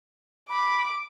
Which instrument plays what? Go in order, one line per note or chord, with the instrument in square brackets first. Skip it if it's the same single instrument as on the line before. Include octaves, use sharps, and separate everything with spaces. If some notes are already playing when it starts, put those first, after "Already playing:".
[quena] B5 [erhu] D6